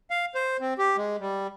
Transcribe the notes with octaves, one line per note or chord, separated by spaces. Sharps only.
F5
C5
C4
G4
G#3
G3